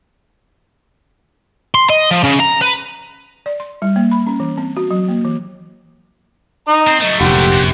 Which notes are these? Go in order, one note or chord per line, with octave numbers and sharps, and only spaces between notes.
C6
D#5
F3
C#3
A#5
B4
D5
C6
G3
A#3
B5
C#4
E3
C4
F#4
F#3
A#3
E3
D#4 A#5 D#6
C4
F#3 A3 D#5
F1 A#1 G4 F#5 C6
F#2